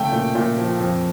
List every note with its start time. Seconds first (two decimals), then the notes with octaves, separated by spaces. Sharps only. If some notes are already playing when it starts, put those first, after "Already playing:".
Already playing: C#3 A3 G5
0.12 A#2
0.35 A#2
0.58 F3
0.80 F2